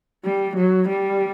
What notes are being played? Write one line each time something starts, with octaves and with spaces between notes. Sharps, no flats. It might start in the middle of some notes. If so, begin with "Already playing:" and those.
G3
F#3
G3